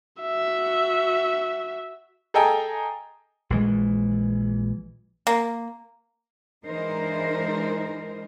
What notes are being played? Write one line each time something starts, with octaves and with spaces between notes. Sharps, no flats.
F#4 E5
G#4 A4 D#5 G5 G#5 A#5
A#1 E3 G#3
A#3
E3 G#3 D4 D#4 A#4 C5